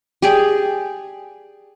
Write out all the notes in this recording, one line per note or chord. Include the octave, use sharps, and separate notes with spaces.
G4 G#4 D5